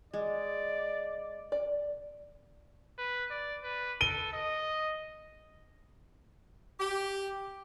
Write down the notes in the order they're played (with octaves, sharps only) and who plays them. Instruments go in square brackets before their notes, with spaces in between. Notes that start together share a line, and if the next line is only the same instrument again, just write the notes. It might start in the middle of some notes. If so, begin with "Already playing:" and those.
[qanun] G#3 [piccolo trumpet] D5
[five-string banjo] D5
[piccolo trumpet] B4
D5
B4
[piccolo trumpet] A4 [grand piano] D#7 G7
[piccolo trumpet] D#5
[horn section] G4